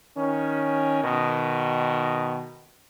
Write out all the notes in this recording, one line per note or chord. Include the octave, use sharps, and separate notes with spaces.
D#3 C#4
B2 D#3